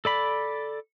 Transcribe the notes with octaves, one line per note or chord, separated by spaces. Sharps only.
A4 D5 B5